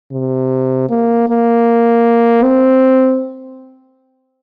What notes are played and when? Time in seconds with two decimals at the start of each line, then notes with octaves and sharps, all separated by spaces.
0.12 C3
0.89 A#3
1.28 A#3
2.43 C4